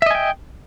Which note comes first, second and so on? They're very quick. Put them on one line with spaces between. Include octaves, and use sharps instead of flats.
E5 D#5 G#5 G5